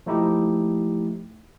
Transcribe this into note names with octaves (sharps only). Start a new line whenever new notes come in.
F3 A3 D#4 E4 G4